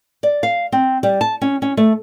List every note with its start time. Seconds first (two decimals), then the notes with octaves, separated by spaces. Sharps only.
0.23 D5
0.43 F5
0.72 C4
1.03 G3
1.21 A5
1.41 C#4
1.62 C#4
1.77 A3